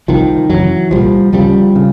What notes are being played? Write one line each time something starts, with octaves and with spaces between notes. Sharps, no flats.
C2 C3 D#3 F3
F#2 C#3 E3 F#3
C2 A#2 F3 G3
D2 C#3 F3 G3
C#3